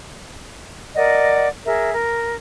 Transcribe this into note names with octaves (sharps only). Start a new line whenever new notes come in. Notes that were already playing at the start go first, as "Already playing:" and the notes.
A#4 D5 D#5 F#5
G#4 A#4 E5
A#4